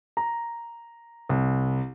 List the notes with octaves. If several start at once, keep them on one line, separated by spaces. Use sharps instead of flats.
A#5
C2